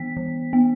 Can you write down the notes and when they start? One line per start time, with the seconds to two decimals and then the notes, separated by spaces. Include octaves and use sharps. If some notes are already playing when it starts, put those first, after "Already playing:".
Already playing: E3 B3 B6
0.17 E3
0.53 B3